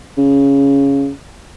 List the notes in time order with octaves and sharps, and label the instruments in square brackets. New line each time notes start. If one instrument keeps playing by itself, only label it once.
[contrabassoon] C#3